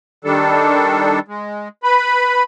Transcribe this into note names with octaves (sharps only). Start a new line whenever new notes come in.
D#3 G3 D4 A4
G#3
B4 B5